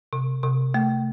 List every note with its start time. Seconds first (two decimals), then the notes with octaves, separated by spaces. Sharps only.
0.13 C3
0.43 C3
0.74 A3